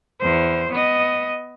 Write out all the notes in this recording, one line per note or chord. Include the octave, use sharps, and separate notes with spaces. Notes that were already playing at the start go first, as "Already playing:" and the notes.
E2 C5
B3 D#5